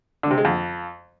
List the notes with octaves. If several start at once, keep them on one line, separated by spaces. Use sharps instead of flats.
D3
C3
G#3
F2